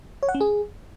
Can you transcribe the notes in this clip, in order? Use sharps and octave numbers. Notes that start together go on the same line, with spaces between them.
C#5
F#5
C#4
G#4